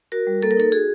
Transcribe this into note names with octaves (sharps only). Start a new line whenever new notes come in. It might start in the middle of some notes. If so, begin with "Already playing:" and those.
F#4 A#4
G3
A#3 A4
A#4
D#4 A4
F#4 G#4